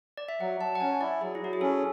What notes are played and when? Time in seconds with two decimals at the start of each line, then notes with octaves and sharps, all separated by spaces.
0.17 D5
0.28 E5
0.41 F#3 F#5
0.60 F#3 A5
0.75 F#5
0.80 C#4 G#5
1.01 E4 D5
1.21 F#3 G#4
1.35 E4
1.42 F#3 F#4
1.53 G#4
1.61 C#4 A4